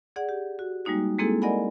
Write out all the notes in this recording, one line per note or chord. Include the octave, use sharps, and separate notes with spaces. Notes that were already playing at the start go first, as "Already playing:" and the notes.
G#4 D5 F#5
G4
F#4
G3 G#3 A#3 D#4 F#4
G#3 A#3 C4 E4 G#4 A4
A#4 D5 D#5 F#5 G#5 B5